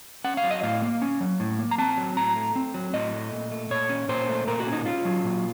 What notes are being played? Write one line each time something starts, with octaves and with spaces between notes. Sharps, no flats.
C#4 F#5
F5
F#3
D#5
A2 F5
A#3
C#4
F#3
A2
A#3
A#5
C4 A5
F#3
A2 A#5
A3
C4
F#3
A2 D#5
A3
A#2
A3
A#2 C#5
C#4
A#2 C5
A3
A#2 A#4
F#4
C#4
D#4
C#4 F4
F#3
A#2